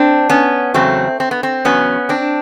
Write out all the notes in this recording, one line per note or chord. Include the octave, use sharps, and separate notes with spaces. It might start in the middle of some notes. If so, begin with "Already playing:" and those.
Already playing: C4 D4
B3 C#4
E2 C#3 F#3 A3 C4
C4
B3
C4
E2 C#3 F#3 B3 C#4
C4 D4